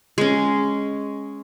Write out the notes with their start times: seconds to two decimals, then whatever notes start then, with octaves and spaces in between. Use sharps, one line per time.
0.18 G#3 C#4